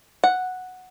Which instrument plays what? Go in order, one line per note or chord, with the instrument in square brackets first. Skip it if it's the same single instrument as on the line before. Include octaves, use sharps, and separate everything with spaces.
[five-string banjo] F#5